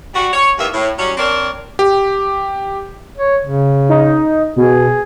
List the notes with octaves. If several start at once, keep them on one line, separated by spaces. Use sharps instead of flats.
G3 F#4
C#5
D#2 A2 A#3 B3 E5
A2
F#3 G3 C#4
C4 D4 A#4 C#5 D5
G4
C#5
C#3
D#4
B2 G#4